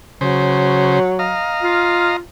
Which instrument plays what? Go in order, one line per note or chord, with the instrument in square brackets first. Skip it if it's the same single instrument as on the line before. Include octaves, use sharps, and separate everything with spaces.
[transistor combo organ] C#3 C5 [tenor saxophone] F#3
[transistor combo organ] D#5 F5 A#5
[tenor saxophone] F4